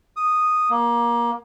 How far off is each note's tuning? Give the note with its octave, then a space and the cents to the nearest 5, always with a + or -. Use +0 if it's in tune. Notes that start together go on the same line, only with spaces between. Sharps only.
D#6 -5
A#3 +25